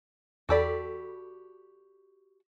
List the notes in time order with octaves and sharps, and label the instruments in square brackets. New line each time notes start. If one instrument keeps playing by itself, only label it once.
[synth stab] E2 A4 B5 [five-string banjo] F#4 G4 D5